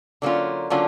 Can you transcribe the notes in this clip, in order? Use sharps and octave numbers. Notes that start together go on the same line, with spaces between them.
D3 F#3 A#3 C#4 F4
D3 F#3 A#3 C#4 F4